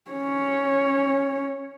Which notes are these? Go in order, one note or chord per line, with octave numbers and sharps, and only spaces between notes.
C#4 C#5